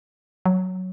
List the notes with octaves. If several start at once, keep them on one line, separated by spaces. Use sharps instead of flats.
F#3